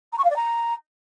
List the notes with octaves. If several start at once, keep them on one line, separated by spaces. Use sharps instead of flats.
A#5
C#6
F5
D5
A#5